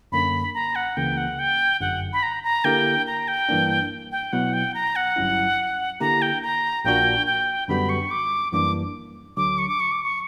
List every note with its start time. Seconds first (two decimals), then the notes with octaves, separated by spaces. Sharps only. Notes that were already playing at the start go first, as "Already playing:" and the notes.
0.12 F#2 D3 A#3 C#4 B5
0.55 A#5
0.75 F#5
0.97 C#2 C#3 E3 A#3 G5
1.17 F#5
1.39 G5
1.80 G1 F#2 D3 F#5
2.13 B5
2.23 A#5
2.44 A#5
2.64 D3 A#3 E4 G4 A#4 G5
3.07 A#5
3.28 G5
3.49 G2 E3 A#3 D4
4.12 G5
4.33 B2 F#3 B3 E4 F#5
4.53 G5
4.74 A#5
4.96 F#5
5.16 G1 G2 F#3 C#4 E4
6.00 D3 A#3 E4 G4 A#5
6.22 G5
6.42 A#5
6.85 A#1 A#2 A#3 D4 F#4 G5
7.27 G5
7.68 F#2 D3 G3 B3 F#4 B5
7.89 C#6
8.11 D6
8.52 F#2 E3 G3 A#3 D4 D6
9.37 D2 D3 F#3 D6
9.58 C#6
9.69 D6
9.80 C#6
9.92 D6
10.03 C#6